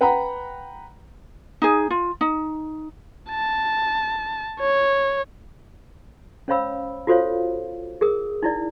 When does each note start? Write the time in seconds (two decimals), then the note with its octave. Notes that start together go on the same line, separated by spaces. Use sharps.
0.01 B4 F#5 G5 A#5 B5
1.62 D#4 G#4
1.90 F4
2.21 D#4
3.30 A5
4.60 C#5
6.48 C#4 C5 C#5 F5 B5 E6
7.07 F4 F#4 A4 C5 C#5 F5
8.01 G#4 A#4 D#6
8.42 D#4 E4 D5